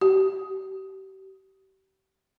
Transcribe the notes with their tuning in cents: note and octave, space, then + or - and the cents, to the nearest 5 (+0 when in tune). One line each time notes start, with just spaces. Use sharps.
G4 -35